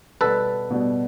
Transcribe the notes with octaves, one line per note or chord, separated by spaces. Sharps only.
B2 G3 B3 D4 F#4 A4 B4
B2 G3 B3 D4 F#4